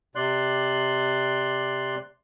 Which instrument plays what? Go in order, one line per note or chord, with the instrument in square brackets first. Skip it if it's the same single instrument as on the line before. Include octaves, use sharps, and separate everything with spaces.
[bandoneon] C3 D5 C6 F#6